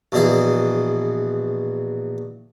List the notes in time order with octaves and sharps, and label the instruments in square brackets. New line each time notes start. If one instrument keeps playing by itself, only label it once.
[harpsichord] A#1 B2 E3 G#4